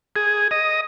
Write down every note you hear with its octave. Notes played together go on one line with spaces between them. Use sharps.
G#4
D#5